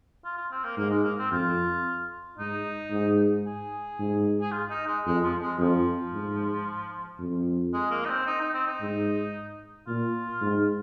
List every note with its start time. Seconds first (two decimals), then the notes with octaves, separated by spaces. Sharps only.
0.25 F4
0.37 F4
0.51 C4
0.64 A#3
0.77 G#2 A#3
0.90 G#3
1.04 A#3
1.18 C4
1.32 F2 F4
2.38 G#2 D#4
2.91 G#2
3.46 G#4
3.99 G#2
4.41 G#4
4.52 F4
4.70 D#4
4.87 G#3
5.05 F2 G#3
5.24 F3
5.41 G#3
5.59 F2 F3
6.13 G#2
7.19 F2
7.73 G#3
7.91 A#3
8.05 D#4
8.10 C4
8.27 D#4
8.41 D#4
8.54 C4
8.67 D#4
8.81 G#2
9.87 A#2 F4
10.41 G#2